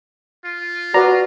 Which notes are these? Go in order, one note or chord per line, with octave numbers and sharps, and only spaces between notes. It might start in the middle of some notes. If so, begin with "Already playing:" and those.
F4
F#4 B4 D5 A#5